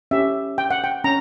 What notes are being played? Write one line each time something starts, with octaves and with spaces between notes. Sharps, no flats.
C#4 G4 E5
G5
F#5
G5
C#4 A#5